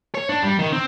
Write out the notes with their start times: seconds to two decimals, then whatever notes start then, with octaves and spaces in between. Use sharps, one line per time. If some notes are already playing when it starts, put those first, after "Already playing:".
0.15 C#5
0.29 D4
0.43 G3
0.59 D#3
0.72 C4